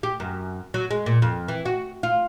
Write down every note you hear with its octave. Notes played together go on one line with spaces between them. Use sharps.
G4
F#2
F#3
G#3
A#2
F2
E3
F#4
F4